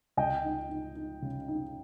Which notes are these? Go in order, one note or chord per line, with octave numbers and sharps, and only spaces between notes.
C#2 D#5 G5
D#4
D#4
D#4
C#3
D#4